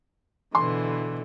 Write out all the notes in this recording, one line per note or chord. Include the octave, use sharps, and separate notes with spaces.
B2 D3 E3 C6